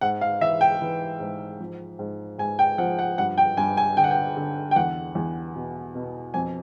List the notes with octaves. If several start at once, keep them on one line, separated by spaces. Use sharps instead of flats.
G#2 F#5
F5
E3 E5
G5
E3
G#2
F3
G#2
G#2 G#5
G5
F3 F#5
F#5
G2 F#5
G5
G2 G#5
G#5
D3 G5
F#5
G5
D3
G5
E2 F#5
E2
B2
B2
F2 G#5